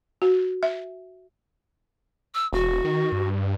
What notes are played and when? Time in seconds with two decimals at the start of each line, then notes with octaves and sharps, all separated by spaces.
0.22 F#4
0.63 E5
2.34 E6
2.53 E1 F#4
2.85 D#3
3.12 G2